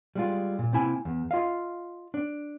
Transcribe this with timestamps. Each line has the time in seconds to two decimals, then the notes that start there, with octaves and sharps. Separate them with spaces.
0.15 G3 G#3 F4
0.59 A#2
0.73 C3 A#3 E4 G#5
1.05 E2
1.31 F4 D#5 F5
2.14 D4